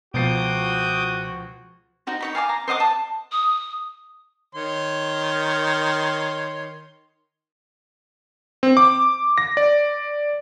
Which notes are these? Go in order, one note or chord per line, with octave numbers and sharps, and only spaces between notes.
C#2 B2 F3 F#4 D6 D#6 G6 C7
D#4 F#4 C5
D#4 C#5 B5
F5 G#5 A5 D6
A#5
C5 D#5 F#5 D6
A5
D#6
D#3 C#5 C6
C4
D6
A#6
D5